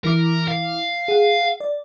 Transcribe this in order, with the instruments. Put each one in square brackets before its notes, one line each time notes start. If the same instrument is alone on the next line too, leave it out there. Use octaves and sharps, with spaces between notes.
[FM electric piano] E3 E4 D6 [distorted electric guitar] A#4
[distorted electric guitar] F5
[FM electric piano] G#4 F#5
D5